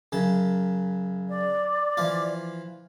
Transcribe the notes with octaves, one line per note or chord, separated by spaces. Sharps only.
F#2 C#3 A5
D5
E3 F3 F4